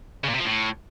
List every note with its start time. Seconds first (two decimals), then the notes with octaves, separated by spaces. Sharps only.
0.24 C#3
0.29 A#2
0.35 C3
0.40 F3
0.45 A2